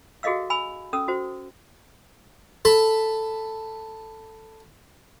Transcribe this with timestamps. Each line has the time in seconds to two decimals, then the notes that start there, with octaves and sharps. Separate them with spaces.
0.23 F#4 G#4 A4 D#5 F5 E6
0.50 G#5 B5 E6
0.93 C#4 A4 D#6 E6
1.08 F#4 C5
2.65 A4 A5 B5